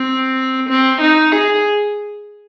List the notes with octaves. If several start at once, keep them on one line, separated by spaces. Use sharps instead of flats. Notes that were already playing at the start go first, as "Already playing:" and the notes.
Already playing: C4
C4
D#4
G#4